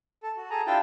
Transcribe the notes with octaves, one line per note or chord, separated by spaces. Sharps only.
A4
F#4
G#4 A4 G#5 A#5
D4 E4 F4 G4 G5 A5